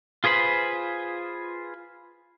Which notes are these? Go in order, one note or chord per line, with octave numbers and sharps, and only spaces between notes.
F4 G#4 B4 C5 B5